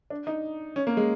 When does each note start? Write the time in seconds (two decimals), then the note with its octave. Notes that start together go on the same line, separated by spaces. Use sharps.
0.10 D4
0.27 D#4
0.76 C#4
0.87 A#3
0.97 G#3